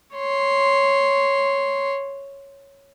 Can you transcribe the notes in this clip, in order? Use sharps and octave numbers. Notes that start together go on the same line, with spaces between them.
C#5 C6